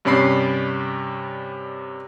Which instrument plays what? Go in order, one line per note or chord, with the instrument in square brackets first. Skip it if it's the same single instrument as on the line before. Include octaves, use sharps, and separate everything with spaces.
[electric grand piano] G2 C3 C#4 D5 B5 C7